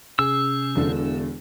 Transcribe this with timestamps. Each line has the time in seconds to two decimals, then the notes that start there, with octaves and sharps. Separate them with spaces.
0.19 C3 C#4 G#4 E6
0.75 E1 E2 D3 A4